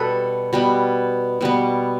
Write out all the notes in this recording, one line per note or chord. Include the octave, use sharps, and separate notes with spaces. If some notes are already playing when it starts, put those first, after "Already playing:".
Already playing: B2 G3 B3 A4 B4
B2 G3 B3
B2 G3 B3